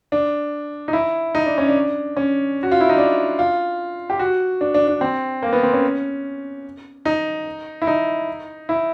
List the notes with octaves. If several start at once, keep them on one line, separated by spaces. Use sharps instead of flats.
D4
D#4
E4
D#4
D4
C#4
D4
C#4
F#4
F4
E4
D#4
D4
F4
G4
F#4
D4
D4
D4
C4
A#3
B3
C4
C#4
D#4
E4
D#4
E4